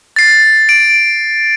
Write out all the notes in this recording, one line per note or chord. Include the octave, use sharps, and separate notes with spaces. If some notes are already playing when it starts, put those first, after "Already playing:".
A6 C7
D7